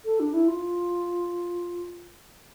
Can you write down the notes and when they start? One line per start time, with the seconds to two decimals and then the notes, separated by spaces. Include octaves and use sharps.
0.05 A4
0.20 D4
0.34 E4
0.48 F4